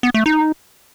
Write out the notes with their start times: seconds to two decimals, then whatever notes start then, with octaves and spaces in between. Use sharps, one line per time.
0.03 B3
0.14 A3
0.26 D#4